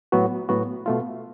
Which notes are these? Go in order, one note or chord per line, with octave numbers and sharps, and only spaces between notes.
A2 F#3 B3 F#4
A2 F#3 B3 F#4
B2 A3 F4